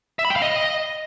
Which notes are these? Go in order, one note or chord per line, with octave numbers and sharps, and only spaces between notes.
E5
B5
G5
F5
D#5